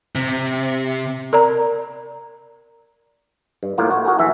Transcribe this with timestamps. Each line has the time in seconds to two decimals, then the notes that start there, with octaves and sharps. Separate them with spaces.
0.15 C3
1.33 A#4 D5 A#5
3.63 G2
3.78 A2 A#3 F4
3.91 F#4
4.05 F#4 G#4 A#4
4.19 A#1 E3 E5